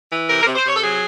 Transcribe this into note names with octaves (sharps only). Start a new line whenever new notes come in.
E3
C3 A#4
A#4
C3
C5
C3 C#5
A4
F#3 G#4